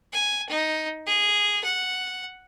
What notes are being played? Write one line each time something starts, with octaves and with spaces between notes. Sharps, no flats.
G#5
D#4
G#4
F#5